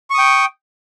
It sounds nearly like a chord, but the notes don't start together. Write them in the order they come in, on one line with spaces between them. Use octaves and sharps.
C#6 D#6 G5